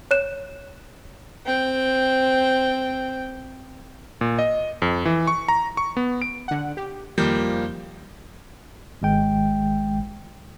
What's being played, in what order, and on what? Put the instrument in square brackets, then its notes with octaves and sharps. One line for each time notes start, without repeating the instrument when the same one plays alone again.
[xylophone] C#5 F#6 E7
[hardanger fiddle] C4 G5
[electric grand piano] A#2
D#5
F2
E3
C#6
A#5
C#6
B3
D7
[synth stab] D3 F#5
G4
[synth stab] F2 D#3 G6 [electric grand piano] F3 G3 A#3
[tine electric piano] G#1 G#3 G5